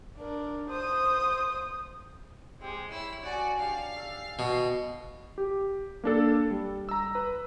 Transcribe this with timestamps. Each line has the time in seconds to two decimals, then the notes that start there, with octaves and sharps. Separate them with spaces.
0.18 D4 A#4
0.69 C5 D#6
2.61 G#3 C4 G4
2.91 E4 C#5 E6
3.23 F#4 D5 F#5 G#5 A5
3.59 D4 G4 F5
3.96 A4 E5
4.39 B2 C#6
5.38 G4
6.04 A#3 D4 A4
6.50 G3
6.89 A#5 E6
7.15 B4